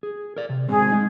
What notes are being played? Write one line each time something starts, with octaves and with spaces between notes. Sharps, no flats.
G#4
A#4 D5
C3
G#2 G#3 C4 G#4
G#3 D#4